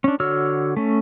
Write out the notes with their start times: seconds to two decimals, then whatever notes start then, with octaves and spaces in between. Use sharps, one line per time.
0.04 C#4 D4
0.20 D3 F#4 C#5 E6 F6
0.77 A3 C#4